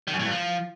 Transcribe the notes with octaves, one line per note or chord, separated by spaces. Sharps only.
D#3
F#2
A2
G2
F3